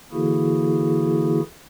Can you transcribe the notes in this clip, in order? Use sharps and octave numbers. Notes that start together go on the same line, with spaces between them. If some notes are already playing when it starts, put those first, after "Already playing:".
D3 E3 A#3 E4 F#4 G#4